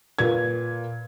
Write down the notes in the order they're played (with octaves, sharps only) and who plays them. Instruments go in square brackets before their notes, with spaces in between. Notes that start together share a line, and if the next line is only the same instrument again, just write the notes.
[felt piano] A#2 B4 G#6